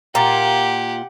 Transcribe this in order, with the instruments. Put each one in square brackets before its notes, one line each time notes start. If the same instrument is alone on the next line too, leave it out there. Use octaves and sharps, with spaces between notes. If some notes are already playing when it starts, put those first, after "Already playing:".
[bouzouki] A#2 [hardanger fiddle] G4 F#5 [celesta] A#5 D6 A6